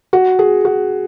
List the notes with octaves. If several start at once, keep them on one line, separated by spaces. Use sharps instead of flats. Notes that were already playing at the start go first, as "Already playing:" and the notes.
F#4
G#4
F#4